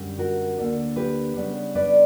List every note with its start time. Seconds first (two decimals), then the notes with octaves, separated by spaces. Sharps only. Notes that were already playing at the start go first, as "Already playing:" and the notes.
Already playing: F#2 D3 G3 C#4
0.19 F#4 A#4
0.58 D2 D3 A#3 D4
0.96 G4 B4
1.36 C#3 G3 B3 D4
1.75 B4 D5